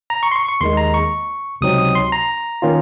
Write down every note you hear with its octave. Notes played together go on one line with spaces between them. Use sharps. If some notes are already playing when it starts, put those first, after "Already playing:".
A#5
C#6
C6
C#6
C#6
D#2 D#3 G#3 C6
A#5
C#6
C#2 C3 F#3 C4 D#4 D#6
D#6
C6
A#5
D#3 A#3 C#4 F4